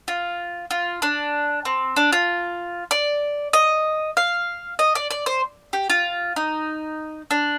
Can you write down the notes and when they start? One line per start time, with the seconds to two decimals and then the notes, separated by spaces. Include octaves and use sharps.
0.08 F4
0.71 F4
1.02 D4
1.65 C4
1.96 D4
2.12 F4
2.91 D5
3.53 D#5
4.17 F5
4.79 D#5
4.95 D5
5.11 D5
5.26 C5
5.73 G4
5.90 F4
6.36 D#4
7.31 D4